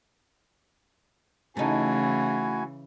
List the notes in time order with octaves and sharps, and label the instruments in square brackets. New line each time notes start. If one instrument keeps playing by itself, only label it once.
[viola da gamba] C#3 E3 [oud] A3 D#4 [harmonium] E4 F#4 G#5